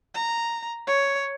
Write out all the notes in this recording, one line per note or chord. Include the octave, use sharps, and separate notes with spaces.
A#5
C#5